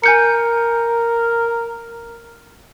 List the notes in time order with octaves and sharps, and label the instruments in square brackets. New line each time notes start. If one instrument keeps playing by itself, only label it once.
[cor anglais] A#4 [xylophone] G#5 G6 C#7